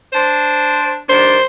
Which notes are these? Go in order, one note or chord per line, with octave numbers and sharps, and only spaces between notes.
D4 C5
D#3 G3 D4 C5